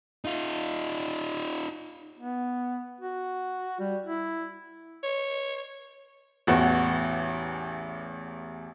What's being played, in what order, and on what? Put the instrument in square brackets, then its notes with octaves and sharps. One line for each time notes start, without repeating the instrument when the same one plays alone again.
[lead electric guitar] D#4 F4
[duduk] B3
F#4
G3
E4
[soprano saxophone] C#5
[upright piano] A1 E2 F#4